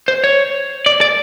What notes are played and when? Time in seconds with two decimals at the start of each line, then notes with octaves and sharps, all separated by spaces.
0.08 C5
0.24 C#5
0.86 D5
1.01 D5